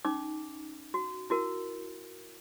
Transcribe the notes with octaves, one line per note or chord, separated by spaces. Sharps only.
C#4 D#4 D6
F#4
E4 F#4 A#4